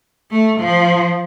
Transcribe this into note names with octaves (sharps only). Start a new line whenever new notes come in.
A3
F3